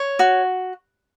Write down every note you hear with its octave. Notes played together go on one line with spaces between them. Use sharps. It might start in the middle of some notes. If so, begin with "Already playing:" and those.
Already playing: C#5
F#4